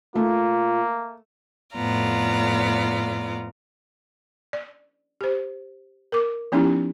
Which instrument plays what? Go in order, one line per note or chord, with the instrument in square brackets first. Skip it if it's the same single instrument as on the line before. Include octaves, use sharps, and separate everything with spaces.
[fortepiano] A3 [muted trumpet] A#3 [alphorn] F4
[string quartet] F2 A2 B3 F4 D5 A#5
[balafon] D5
G4 C5
A#4 D6
F3 B3 C#4 D#4 E4 G4